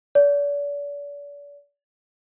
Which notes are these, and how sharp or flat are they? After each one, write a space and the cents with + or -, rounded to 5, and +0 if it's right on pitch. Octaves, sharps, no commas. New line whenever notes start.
D5 -40